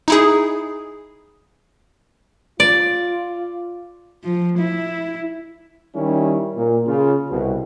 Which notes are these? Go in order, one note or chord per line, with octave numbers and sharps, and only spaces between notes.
D#4 E4 G#4
F4 D5
F3
E4
D#3 G3 C#4 E4
A#2
C#3 F4
C2 B2